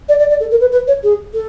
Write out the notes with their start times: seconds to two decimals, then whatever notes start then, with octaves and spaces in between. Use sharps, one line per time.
0.08 D5
0.19 D5
0.30 D5
0.40 A4
0.51 A#4
0.60 B4
0.72 B4
0.87 C#5
1.03 G#4
1.34 A4